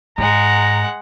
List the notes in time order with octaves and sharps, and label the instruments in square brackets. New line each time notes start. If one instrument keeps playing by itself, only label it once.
[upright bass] G#2 [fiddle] G#3 F#5 [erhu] A#5